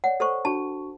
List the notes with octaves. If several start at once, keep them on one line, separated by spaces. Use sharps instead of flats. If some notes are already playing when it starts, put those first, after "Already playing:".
C#5 D5 F#5
A4 C5 C#6
D4 F#4 A5 C#6